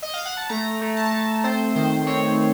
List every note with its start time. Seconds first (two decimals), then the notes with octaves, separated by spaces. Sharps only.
0.02 D#5
0.13 F5
0.25 F#5
0.37 A5
0.49 A3 A#5
0.81 A3
0.97 A5
1.12 A3
1.44 C4 C5
1.76 D#3 C5
2.07 C4 C#5